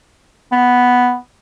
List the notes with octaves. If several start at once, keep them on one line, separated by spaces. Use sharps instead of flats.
B3